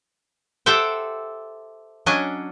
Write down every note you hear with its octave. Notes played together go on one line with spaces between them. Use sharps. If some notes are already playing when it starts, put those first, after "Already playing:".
G4 A4 C5 E5 F#5 G5
F#3 C#4 D4 D#5 G#5